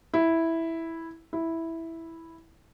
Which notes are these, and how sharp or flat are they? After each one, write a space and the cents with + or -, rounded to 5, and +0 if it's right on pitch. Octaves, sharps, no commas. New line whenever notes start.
E4 -5
E4 -5